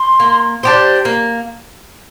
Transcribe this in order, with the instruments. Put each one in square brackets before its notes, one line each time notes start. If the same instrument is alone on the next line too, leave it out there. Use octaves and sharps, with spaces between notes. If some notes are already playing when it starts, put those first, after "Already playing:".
Already playing: [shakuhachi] C6
[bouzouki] A#3
D4 G4 C5
A#3